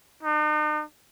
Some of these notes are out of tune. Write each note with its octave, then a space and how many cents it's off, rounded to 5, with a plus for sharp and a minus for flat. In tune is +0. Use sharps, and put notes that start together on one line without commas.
D#4 -45